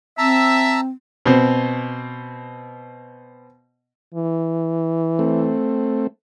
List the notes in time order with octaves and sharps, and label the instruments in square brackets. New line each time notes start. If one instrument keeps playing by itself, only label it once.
[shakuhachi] C4 [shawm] E5 [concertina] A5 A#5 E6
[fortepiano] B2 C4
[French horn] E3
[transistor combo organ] A3 C4